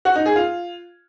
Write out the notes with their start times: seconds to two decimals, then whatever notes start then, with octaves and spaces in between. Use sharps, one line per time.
0.05 F#4
0.15 D#4
0.26 G#4
0.36 F4